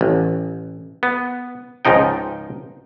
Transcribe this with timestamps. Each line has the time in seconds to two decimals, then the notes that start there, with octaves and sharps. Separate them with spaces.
0.01 A1
1.03 B3
1.85 C#2 G#2 F3 D#4 G5